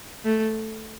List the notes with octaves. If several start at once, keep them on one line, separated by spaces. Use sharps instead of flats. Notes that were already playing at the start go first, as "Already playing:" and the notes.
A3